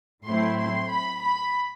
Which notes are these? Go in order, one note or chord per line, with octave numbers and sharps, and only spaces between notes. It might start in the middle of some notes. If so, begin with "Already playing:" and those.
A2 F#3 A3 C4 E4 C6
C6
B5
B5